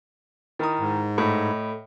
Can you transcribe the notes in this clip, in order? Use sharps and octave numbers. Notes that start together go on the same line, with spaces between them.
D#3 E4 A#4 A#5 D#6
G#2
A2 D#5 B5